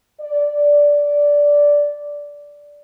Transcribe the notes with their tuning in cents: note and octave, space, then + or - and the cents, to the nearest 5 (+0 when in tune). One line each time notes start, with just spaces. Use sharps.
D5 -10